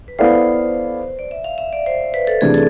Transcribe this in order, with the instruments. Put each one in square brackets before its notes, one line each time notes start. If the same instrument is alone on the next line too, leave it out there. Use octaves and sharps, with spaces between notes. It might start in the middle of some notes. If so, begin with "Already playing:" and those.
[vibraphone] B4
[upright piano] B3 E4 A4 D5 F5 [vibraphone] C5
[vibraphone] D5
E5
F5
E5
D5
C5
B4
A4
[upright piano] C3 E3 A3 D4 [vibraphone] G#4
[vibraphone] A4